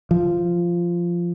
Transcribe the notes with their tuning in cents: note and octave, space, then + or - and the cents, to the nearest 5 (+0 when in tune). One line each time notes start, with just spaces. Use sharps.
F3 -10